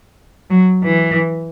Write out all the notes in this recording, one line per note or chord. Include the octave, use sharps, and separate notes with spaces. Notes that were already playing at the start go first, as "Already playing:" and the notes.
F#3
E3